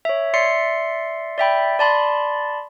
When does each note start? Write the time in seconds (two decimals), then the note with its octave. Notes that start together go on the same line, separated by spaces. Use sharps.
0.05 C#5 E5
0.34 D5 E5 C6 C7 C#7
1.38 D5 E5 G5 B5
1.79 D5 A5 B5 C6